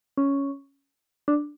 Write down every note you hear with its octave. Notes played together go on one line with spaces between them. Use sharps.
C#4
D4